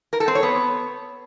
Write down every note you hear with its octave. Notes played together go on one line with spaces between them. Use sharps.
A#4
A4
C4
C#5
B3